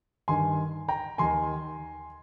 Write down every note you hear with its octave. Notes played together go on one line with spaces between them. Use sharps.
G2 D#3 G#5 C6
G5 A#5
D#2 D#3 G#5 C6